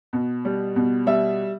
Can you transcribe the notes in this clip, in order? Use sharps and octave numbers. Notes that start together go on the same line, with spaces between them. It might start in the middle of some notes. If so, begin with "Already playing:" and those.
B2
G3
B2
G3 E5